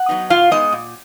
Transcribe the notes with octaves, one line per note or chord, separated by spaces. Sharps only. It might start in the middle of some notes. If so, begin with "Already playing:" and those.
Already playing: F#5
F#3 B3 D#4
B2 F4 F5
G#3 B3 D#4 D#5
A#2